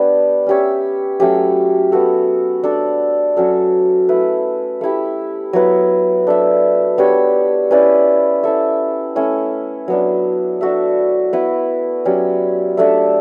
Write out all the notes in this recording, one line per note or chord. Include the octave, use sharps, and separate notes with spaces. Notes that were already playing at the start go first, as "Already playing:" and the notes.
Already playing: B3 D4 G4 D5
C#4 G4 C#5 E5
F#3 A3 C#4 G4
B3 F#4 A4
D4 A4 D5
F#3 C#4 F#4 A4
A3 E4 B4
A3 E4 G4
F#3 B3 E4 B4
D4 A4 E5
B3 D4 G4 C#5
C#4 E4 B4 D5
E4 A4 E5
A3 C#4 E4
F#3 B3 D4
D4 F#4 A4 E5
B3 E4 B4
F#3 C#4 G4 D5
A3 D4 A4 E5